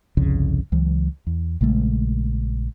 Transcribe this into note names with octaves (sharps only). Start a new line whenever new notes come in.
G1 C2 F2 C#3
C#2 E3 F#3
E2
A#1 C#3 G#3 A3